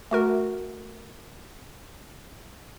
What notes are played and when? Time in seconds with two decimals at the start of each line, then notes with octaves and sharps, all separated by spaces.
0.11 A3 F#4 A#4